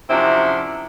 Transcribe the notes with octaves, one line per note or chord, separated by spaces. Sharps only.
F#2 C3 F3 C4 D4 E4